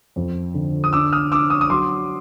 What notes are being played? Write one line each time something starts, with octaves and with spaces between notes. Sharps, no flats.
F2
D3
D#6
D4 D6 E6
D#6 F6
D4 D6 E6
C#6 D#6
D#6
F#3 C6 D6